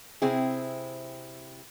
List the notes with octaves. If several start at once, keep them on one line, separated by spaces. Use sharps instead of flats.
C3 C4 E4 G#4